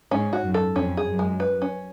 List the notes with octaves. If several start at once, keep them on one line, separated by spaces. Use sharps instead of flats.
G#2 C#4
F#4
F#2
A4
F2 C#4
G#4
F#2
G#3
B4
C#4